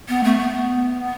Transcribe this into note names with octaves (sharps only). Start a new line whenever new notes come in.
B3
A3
B3